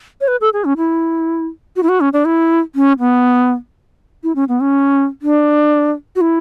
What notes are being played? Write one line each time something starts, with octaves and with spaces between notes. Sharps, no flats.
C#5
B4
A4
G#4
C#4
E4
F#4
E4
F#4
C#4
D4
E4
C#4
B3
E4
C#4
B3
C#4
D4
F#4
E4